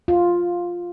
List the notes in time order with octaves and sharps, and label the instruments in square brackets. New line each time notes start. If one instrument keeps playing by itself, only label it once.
[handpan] F4